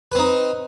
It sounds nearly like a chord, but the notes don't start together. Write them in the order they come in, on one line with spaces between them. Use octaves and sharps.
B4 C4 D#4